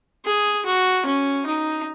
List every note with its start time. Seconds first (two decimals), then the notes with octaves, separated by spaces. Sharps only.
0.25 G#4
0.65 F#4
1.05 C#4
1.46 D#4